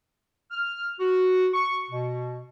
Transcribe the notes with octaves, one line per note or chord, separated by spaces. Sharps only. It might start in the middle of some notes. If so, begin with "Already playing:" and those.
F6
F#4
C#6
B2